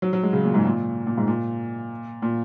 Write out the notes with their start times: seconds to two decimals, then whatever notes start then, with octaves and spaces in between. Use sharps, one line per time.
0.02 F#3
0.13 F#3
0.23 G#3
0.33 C#3
0.44 A#2
0.54 G#2
0.65 A#2
1.07 A#2
1.17 G#2
1.27 A#2
2.22 A#2